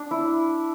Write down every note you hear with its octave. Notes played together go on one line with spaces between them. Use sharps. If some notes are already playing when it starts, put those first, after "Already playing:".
Already playing: D4
E4